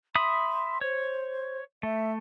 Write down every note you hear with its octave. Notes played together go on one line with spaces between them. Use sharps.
E5 B5 C6 D#6
C5 C#5
A3 E5